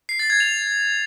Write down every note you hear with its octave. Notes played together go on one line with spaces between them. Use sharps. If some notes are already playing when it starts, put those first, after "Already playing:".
C7
A6
G#6
F7